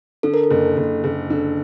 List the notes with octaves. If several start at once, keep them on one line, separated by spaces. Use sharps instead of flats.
D3 A4
A#4
A4
F#1
F#1
F#1
D3